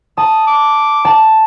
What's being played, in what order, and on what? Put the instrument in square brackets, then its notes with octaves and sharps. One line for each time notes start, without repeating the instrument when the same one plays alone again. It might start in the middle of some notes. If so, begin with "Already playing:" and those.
[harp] A5 [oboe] D#6
[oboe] D6
[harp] A5